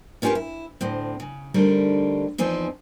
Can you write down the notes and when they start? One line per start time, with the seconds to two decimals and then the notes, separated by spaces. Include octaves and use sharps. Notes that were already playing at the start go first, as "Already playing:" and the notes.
0.22 B3 C#4 F4 G4 A#4 B4
0.35 E4
0.81 D2 A2 C4
1.20 C#3
1.54 D3 G3 A3 C4 D#4 A#4
2.38 E2 F3 C4 D#4 G#4